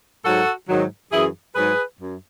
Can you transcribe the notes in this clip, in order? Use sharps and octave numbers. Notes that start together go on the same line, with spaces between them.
G#2 F#3 F#4 A4
G#2 D#3 F#3
F#2 E3 E4 G#4
G#2 F#3 G#4 B4
F#2